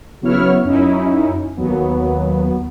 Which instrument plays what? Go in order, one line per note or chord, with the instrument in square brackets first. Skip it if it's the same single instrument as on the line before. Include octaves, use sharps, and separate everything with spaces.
[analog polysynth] C#3 F#3 B3 E4 C#5 F6
F#2 C#4 D#4 E4
D#2 F#3 B3